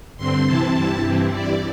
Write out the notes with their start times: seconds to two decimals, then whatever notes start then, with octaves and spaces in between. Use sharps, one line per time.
0.17 G2 D3 C4 C6
0.46 C3 E3 C4 E4 A5
0.75 G2 G3 E4
1.03 G2 E3 G3 C4 E4
1.32 G2 G3 E4 D5